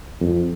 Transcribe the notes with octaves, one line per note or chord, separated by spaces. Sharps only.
F2